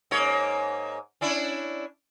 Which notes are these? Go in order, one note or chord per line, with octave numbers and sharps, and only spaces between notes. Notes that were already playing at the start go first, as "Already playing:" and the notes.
G#2 A#3 C#5
C#4 D4 E4